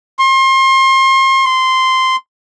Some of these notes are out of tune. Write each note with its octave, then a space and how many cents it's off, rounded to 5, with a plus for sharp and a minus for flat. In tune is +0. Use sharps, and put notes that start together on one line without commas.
C6 +35
C6 -10